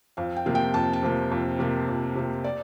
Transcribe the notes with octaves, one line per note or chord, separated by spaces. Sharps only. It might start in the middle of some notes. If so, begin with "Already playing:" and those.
F2 F5
G5
C3 F3 A#3
G5
F2 A5
A5
C3 F3 A#3
F2
C3 F3 A#3
F2
C3 F3 A#3
D5